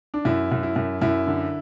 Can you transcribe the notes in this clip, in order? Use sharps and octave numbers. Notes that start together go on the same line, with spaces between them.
D4
F#2 E4
F#2
E4
F#2
F#2 E4
D3